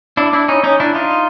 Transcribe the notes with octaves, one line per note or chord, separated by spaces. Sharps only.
D4 E4
D4 E4
C#4 D#4
C#4 D#4
D4 E4
D#4 F4